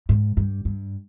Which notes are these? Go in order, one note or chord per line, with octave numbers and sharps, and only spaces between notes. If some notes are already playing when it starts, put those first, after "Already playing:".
G#2
G2
G2